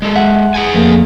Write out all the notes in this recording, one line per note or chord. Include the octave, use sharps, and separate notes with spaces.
G#3 A4
E5 F#5
G#4 F#5 G#5
F2 A3 A#3